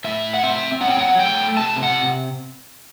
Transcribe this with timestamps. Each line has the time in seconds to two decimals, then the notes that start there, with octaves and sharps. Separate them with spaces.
0.04 A2 E5
0.34 F#5
0.43 C4 E5
0.81 F#3 F#5
0.90 G5
0.99 F#5
1.19 A3 G5
1.57 C3 A5
1.83 F#5